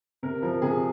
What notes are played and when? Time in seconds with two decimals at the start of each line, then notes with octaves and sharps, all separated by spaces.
0.23 C3 A#4
0.42 F3 A#4
0.62 C3 G#4